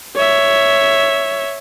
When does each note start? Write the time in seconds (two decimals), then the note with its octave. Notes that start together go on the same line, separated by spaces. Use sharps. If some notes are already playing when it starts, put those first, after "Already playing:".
0.16 C#5 E5